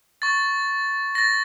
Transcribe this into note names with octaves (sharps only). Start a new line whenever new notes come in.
C#6 A6
A6 A#6